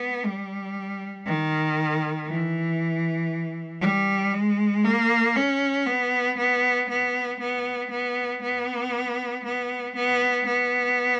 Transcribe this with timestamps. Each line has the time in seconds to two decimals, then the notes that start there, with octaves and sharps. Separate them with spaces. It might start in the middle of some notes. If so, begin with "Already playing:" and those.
Already playing: B3
0.25 G3
1.26 D#3
2.28 E3
3.81 G3
4.34 G#3
4.85 A#3
5.36 C#4
5.86 B3
6.38 B3
6.89 B3
7.40 B3
7.90 B3
8.42 B3
9.44 B3
9.96 B3
10.46 B3